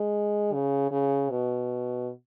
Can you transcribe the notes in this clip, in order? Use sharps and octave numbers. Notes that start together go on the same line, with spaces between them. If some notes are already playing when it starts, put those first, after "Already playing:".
Already playing: G#3
C#3
C#3
B2